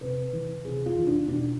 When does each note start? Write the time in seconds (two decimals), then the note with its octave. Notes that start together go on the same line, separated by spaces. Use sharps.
0.01 C3 B4
0.33 E3
0.65 C3 G#4
0.86 F4
0.97 E3
1.07 D4
1.28 B2 D4